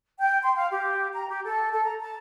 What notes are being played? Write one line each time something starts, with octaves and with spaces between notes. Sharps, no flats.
G5
C6
F5
G4
A#5
G4
A4
A4
A#5
A5